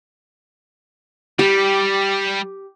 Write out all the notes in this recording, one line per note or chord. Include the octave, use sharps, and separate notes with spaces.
G3 G4